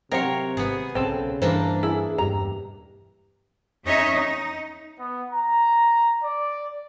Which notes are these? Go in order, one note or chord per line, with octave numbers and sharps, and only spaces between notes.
C3 F#3 C4 A#4 C#5 F5
G#1 B3 G#4
B1 C#3 C4 A4
G2 E3 A#3 D4 C5
E4 G#4
E1 G2 G4 A#5
E2 C#4 D#4 C#5 D#5 E5
D#4
B3
A#5
D5